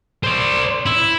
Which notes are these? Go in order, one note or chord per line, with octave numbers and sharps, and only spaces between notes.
C5 D5
E4